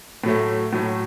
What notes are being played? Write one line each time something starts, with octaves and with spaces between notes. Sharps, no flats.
A2 F#3 A3
A2 F#3 A3